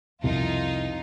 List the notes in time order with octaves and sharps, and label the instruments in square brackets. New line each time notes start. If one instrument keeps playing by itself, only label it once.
[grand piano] C2 [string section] F2 D#4 F4